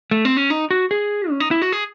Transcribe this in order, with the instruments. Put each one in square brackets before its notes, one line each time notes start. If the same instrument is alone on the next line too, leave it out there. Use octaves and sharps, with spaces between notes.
[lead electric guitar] A3
C4
C#4
D#4
F#4
G#4
C#4
D#4
E4
F#4
G#4